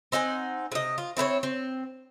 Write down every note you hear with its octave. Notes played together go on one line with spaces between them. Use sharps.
C4 D#4 F#5 G#5
C3 D#5
F4
C4 E4 B4 C#5
C4